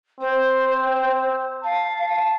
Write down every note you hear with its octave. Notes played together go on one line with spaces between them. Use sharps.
C4 C5
F5 A5